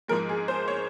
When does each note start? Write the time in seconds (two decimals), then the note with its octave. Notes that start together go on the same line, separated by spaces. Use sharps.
0.08 G#2 F3 G#3 A#4
0.29 G#4
0.48 C5
0.68 C#5